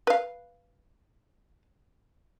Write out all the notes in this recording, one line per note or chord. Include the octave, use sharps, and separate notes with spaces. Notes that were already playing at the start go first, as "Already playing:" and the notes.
B4 F5